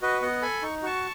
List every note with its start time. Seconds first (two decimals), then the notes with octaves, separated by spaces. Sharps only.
0.02 F#4 B4 D#5
0.22 B3 D#5 F#5
0.42 A4 G#5 B5
0.62 D#4 C#6
0.82 F#4 A5 C#6